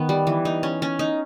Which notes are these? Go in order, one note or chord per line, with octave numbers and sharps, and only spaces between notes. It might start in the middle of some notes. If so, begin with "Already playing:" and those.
Already playing: D#3 B3
G3
E3
D#4
C#4
C#4
D#4